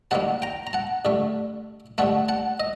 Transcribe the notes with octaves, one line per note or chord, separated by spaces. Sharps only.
D#2 D#3 G3 A#3 F#5 A5
G5 A#5
A#5
F#5 A5
G2 D3 A3
G2 D3 A3 F#5 A5
F#5 A5
D#5